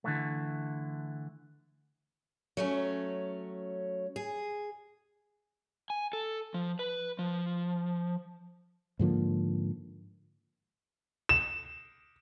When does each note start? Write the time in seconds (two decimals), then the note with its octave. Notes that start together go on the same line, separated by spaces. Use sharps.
0.04 D3 E3 A3
2.57 F#3 A3 C#4
4.16 G#4
5.90 G#5
6.13 A4
6.54 F3
6.79 B4
7.19 F3
8.99 G#2 D3 F3 A#3
11.29 E7